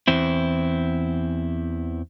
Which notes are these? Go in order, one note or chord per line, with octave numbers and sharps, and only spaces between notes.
E2 C4 E4